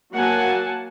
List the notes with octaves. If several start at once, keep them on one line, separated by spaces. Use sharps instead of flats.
F#3 A#3 F#5 G#5 A5